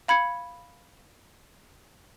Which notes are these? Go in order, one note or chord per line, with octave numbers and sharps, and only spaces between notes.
F5 B5 G#6 C#7